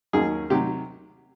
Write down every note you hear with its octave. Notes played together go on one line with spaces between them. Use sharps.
D#2 D#3 F#3 A#3 C#4 G#4
C3 D#3 F#3 G4